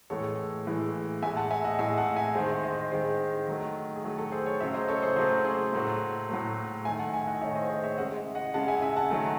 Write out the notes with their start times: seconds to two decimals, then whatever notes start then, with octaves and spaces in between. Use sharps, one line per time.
0.10 A2 E3 G#3 A4 C#5
0.67 A2 E3 G#3
1.23 A2 E5 G#5
1.26 G#3
1.37 F#5 A5
1.51 E5 G#5
1.65 D#5 F#5
1.79 A2 G#3 E5 G#5
1.98 F#5 A5
2.16 E5 G#5
2.35 D#3 G#3 G#4 C5
2.63 C5 D#5
2.91 D#3 G#3 G#4 C5
3.47 D#3 F#3 A3
3.96 G#4
4.04 D#3 F#3 A3 A4
4.18 A4
4.32 G#4 C5
4.46 A4 C#5
4.60 C#3 F#3 A3 C#5 E5
4.74 C5 D#5
4.88 A4 C#5
5.02 G#4 C5
5.16 C#3 F#3 A3 G#4 C5
5.45 G#4 C5
5.73 A2 F#3 A3
6.29 A2 F#3 A3
6.85 D#3 A3 E5 G#5
6.99 F#5 A5
7.13 E5 G#5
7.27 D#5 F#5
7.41 D#3 C#5 E5
7.45 A3
7.55 C5 D#5
7.70 G#4 C5
7.84 C#5 E5
7.98 C#3 G#3 D#5 F#5
8.35 D#5 F#5
8.54 C#3 G#3 F#5 A5
8.68 E5 G#5
8.77 F#5
8.82 E5 G#5
8.96 F#5 A5
9.10 D#3 F#3 A3